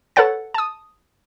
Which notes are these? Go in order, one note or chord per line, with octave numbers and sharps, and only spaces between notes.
A4 B4 C#5 F#5 A6
A5 D#6